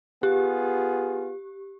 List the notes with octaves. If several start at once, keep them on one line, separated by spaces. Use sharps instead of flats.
B3 F4 G4 G#4